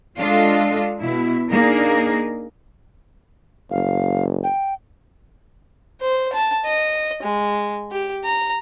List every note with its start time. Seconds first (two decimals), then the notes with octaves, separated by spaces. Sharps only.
0.17 G#3 D4 F4 A4 D#5
0.99 B2 E4
1.50 A#3 D4 D#4 G#4 A#4
3.71 F#1 F5
4.44 G5
6.02 C5
6.33 A5
6.66 D#5
7.23 G#3
7.92 G4
8.24 A#5